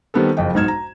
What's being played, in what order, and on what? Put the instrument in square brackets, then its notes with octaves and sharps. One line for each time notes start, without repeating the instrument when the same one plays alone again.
[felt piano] D#3 G3 B3 C4 A4
F#1 F2 D#5 G5
B1 G#2 D#4 F6 G#6 E7
A#5